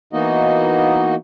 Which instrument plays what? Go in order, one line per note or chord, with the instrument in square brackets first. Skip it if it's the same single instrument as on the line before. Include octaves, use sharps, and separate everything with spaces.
[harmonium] E3 A#3 B3 D#4 F#4 D#5